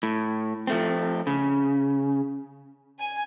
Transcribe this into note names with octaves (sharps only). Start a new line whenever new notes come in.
A2
F3 A3 C4
C#3
G#5